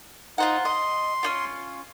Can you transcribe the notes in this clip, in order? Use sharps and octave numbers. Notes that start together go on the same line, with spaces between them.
D#4 F4 C5 F#5
D#5 C6
C#4 D#4 F4